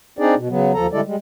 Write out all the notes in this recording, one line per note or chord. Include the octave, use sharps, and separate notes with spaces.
C4 D4 D#4 G#4 D5
B2
C#3 F#3 B3
D#2 F3 A4 A#5
D3 G3 G#3 E4 A4 D5
G3 G#3